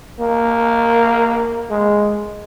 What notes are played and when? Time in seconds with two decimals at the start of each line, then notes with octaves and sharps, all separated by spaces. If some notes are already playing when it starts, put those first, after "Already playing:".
0.20 A#3
1.70 G#3